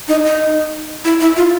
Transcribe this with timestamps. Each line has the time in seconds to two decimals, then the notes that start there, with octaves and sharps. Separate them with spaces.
0.08 D#4
0.24 D#4
1.05 E4
1.20 E4
1.37 F4